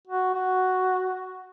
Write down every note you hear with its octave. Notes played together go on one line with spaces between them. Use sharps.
F#4
F#4